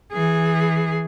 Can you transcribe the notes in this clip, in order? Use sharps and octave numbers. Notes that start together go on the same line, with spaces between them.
E3 G#4